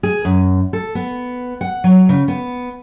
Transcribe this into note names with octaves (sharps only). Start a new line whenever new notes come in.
G#4
F#2
A4
B3
F#5
F#3
C#3
B3